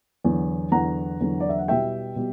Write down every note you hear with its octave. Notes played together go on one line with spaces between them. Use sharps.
E2 D3 F#3
E2 D3 F#3 F#5 A#5
E2 D3 F#3
D5
E5
F#5
B2 G3 B3 E4 E5 G5
B2 G3